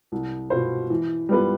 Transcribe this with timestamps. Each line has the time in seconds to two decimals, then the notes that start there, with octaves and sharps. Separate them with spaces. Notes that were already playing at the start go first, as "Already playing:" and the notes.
0.12 C2
0.50 B2 B3 F4 C5
0.90 E3
1.29 G3 B3 F4 B4